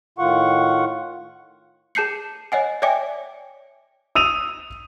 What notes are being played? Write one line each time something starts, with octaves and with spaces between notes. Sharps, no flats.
A2 D#3 F4 F#5 C#6
G#4 A5 G6 C7 C#7
C#5 D#5 F#5 G#5
C#5 D5 E5 G5 G#5 D6
D#6 E6 D#7 F7